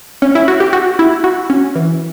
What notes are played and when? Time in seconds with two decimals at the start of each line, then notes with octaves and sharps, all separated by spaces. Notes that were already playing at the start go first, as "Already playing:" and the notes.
0.22 C#4
0.35 E4
0.48 F#4
0.60 G4
0.73 F#4
0.99 E4
1.24 F#4
1.50 C#4
1.75 E3